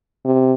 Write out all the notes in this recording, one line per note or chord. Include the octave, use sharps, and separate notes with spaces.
C3